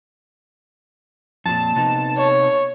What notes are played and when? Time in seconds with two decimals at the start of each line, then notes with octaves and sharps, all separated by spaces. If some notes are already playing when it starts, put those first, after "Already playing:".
1.45 F2 A#2 A5
1.76 C3 B3 D#4
2.17 C#5